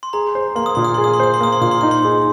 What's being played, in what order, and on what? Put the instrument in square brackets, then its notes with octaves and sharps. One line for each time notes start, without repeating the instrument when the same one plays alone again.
[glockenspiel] C6
[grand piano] G#4 [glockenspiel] A#5
[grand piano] C5
[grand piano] A#3 [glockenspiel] C6
[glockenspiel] D#6
[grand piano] A#2 [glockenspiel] C6
[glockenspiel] D#6
[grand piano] G#4 [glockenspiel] C6
[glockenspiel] D#6
C6
[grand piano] C5 [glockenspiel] D#6
[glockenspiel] C6
[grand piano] A#3 [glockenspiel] D#6
[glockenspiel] C6
[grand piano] A#2 [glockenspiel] D#6
[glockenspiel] C6
[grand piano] D#4 [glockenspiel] D#6
[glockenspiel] C6
[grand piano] G#4